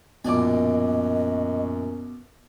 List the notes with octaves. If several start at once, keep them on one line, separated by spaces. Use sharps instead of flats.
A#1 F#2 B2 D4 D#5 G#5 D6